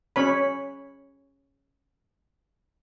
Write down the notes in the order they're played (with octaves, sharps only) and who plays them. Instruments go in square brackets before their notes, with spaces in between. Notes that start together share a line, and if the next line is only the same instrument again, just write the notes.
[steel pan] C#4 C#5 B5